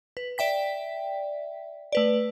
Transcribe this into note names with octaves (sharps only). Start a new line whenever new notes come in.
B4
D5 E5 G5 B6
A3 B4 D5